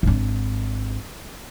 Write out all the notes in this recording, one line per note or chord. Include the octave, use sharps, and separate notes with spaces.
G#1 D4